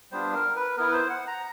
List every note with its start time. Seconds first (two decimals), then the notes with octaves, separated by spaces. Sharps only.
0.12 G3 B3 D4 F4 C5
0.34 A#4
0.56 B4
0.77 B3 E4 A#4
0.87 B4
0.93 C5
1.10 F#5
1.27 A#5